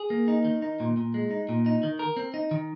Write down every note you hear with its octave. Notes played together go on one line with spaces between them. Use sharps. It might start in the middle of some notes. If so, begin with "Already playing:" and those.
Already playing: G#4
A#3
D#4
D#3
D#4
A#2
A#2
G#3
D#4
A#2
D#4
D#3
A#4
C4
D#4
D#3